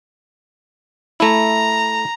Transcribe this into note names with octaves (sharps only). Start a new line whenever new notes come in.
A3 E4 A#5